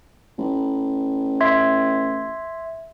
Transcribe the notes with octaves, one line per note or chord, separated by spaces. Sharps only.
A1
E5 C6 G#6